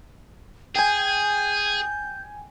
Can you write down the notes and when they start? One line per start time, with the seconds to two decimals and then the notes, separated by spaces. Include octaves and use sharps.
0.76 G#4 G5 G#5 G6